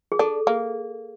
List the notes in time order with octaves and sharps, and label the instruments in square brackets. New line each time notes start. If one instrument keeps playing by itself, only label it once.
[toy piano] G#4
[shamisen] D4 [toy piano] A4
[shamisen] A#3 [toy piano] G#4